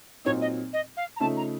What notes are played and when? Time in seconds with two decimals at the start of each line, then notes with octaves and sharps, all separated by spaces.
0.25 A#2 F#3 C4 D#4 C#5
0.41 D#5
0.73 D#5
0.96 F5
1.16 A#5
1.20 C#3 F3 A3 D#4 A5
1.36 A#5